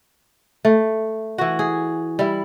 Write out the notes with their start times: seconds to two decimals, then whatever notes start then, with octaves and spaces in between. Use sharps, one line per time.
0.65 A3
1.38 E3 F#4
1.59 G#4
2.19 G3 E4